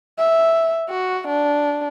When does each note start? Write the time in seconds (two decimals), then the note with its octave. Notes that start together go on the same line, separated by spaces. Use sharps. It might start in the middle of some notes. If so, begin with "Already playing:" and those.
0.18 E5
0.89 F#4
1.28 D4